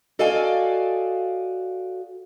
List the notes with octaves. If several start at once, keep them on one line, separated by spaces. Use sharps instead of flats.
F#4 A4 D5 D#5 F5 G#5